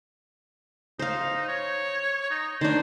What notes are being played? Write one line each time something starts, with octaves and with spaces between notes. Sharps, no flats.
D#4 C5 F5
C#5
D#4
D#3 D4 C5